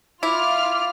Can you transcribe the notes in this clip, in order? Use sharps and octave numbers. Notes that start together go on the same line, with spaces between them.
E4 F4 D6 F6